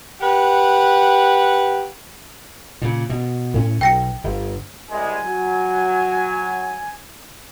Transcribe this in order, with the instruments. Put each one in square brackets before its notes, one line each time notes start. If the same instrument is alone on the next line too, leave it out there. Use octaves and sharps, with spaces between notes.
[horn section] G4 B4 F#5
[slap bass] A#2 C#3
B2
A2 C4 C#4
[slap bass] B1 [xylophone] G5 A#6 C#7
[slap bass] G1
[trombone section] C2 G#3 [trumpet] G#5
[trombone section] F#3